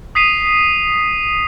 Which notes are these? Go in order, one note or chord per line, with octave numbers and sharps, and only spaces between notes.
D#6 B6 C7 D#7 F7